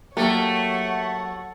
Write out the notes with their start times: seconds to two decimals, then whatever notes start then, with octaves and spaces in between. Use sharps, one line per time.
0.17 F#3 A3 A#3 G4 C#5 F#5